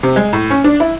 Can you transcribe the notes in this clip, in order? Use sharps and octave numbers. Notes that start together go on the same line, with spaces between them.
C3
G#3
A2
C#4
D4
E4